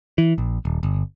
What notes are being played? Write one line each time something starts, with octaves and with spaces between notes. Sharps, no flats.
E3
A#1
D#1
G1